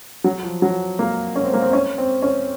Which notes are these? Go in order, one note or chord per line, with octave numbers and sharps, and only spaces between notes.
F#3
F3
F#3
A#3
C#4
C4
A#3
C4
C#4
C4
C#4